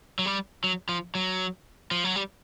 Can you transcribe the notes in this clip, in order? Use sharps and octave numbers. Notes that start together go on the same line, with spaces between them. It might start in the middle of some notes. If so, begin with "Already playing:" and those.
F#3
G3
F#3
F3
F#3
F3
F#3
G3